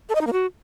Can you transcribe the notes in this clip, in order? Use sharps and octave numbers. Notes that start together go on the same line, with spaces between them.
A4
D#5
D#4
A#3
F#4